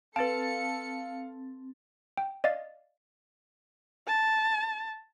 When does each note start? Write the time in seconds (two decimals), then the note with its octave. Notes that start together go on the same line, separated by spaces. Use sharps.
0.16 C4 A4 B4 F5 A5 A6 C#7
2.17 G5
2.44 D5 D#5 F5 A6
4.07 A5